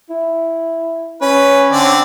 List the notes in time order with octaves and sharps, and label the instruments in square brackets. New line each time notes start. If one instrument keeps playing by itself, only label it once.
[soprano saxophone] E4
[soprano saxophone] C#4 [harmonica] B4
[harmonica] D3 C4 D5